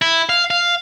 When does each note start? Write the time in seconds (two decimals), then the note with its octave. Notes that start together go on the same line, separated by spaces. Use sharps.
0.02 E4
0.29 F5
0.51 F5